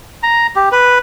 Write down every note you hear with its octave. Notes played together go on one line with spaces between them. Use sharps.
A#5
G4
B4